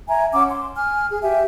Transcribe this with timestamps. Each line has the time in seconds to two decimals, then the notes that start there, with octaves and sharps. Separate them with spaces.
0.08 E5 G#5 A#5
0.32 C#4 F#5 D6 E6
0.48 C6
0.75 G#5 F6
1.08 G#4
1.22 G4 E5 G#5